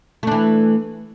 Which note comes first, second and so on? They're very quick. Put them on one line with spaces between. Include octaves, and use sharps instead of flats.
A3 D4 E3